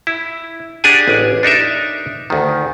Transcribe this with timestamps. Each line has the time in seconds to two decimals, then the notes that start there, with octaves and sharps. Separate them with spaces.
0.07 E4
0.84 D4 G4 G#4 F#5 G#5
1.08 A1
1.43 D4 D#4 A#4 E5
2.30 D2 D#3